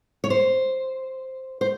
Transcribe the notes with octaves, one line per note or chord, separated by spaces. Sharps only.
C#5
C5
C5